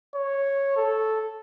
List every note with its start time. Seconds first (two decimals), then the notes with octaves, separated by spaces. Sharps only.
0.15 C#5
0.76 A4